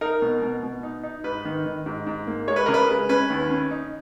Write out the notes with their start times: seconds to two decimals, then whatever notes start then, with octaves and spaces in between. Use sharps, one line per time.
0.01 D#4 A#4
0.22 B2
0.42 B2
0.63 B2
0.83 D#4
1.03 D#4
1.24 G#2 B4
1.45 D#3
1.66 D#3
1.86 G#2
2.07 G#2
2.27 A#3
2.48 G#3 C#5
2.56 B4
2.66 C#3 A#4
2.74 B4
2.89 G#3
3.09 C#4 B4
3.30 D#2
3.50 C#4
3.71 D#4